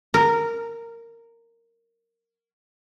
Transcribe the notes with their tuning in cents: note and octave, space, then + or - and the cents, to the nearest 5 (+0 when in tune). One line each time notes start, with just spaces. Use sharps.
A#4 -10